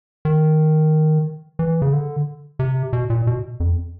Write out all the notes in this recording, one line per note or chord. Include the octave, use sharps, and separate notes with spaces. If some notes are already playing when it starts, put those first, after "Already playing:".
D#3
E3
C#3
D3
C3
B2
A#2
B2
F2